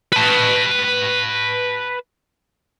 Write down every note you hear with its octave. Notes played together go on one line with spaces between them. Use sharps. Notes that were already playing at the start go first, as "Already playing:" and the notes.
B4 A5